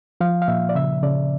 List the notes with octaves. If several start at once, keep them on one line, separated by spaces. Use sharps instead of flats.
F3 F5
F5
A#2 E5
D5
C#3 E5
C#3 D5